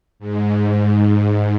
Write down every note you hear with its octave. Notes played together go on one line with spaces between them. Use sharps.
G#2